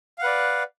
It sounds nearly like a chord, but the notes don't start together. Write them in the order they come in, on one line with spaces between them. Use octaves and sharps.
F5 F#5 B4 D5